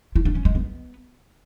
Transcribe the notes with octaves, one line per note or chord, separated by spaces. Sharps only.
E4
D4
C#4
G#3
B3